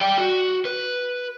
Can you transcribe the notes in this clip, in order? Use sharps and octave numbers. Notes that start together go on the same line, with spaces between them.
D5 G5
F#4
B4